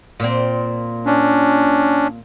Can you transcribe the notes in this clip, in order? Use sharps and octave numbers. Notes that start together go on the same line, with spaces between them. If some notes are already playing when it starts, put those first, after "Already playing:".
A#2 C4
C#4 D4